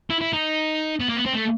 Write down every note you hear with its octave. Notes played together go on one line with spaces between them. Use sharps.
E4
E4
D#4
B3
A#3
B3
C4
A3